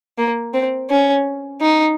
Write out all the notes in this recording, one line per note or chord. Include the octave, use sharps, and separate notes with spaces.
A#3
C4
C#4
D#4